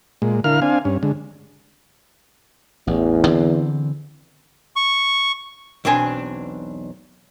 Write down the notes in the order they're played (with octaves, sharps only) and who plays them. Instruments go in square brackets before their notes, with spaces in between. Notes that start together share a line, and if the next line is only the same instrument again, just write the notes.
[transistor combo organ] A#2 G#3
D3 E4 A#4 F5 F6
C4 D4 F5 G#5
G2 C#4
D3 G#3
[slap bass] A1 [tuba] E2
[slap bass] D3 E3 C4
[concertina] C#6
[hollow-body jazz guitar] B1 E2 C4 D4 G#5